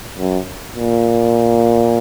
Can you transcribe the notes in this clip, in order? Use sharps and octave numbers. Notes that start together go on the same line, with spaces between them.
F#2
A#2